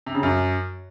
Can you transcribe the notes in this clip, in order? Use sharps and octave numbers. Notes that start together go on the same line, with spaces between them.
C3
C#3
F#2